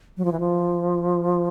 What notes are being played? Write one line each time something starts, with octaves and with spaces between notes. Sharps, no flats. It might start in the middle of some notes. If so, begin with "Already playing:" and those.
F#3
F3
E3
F3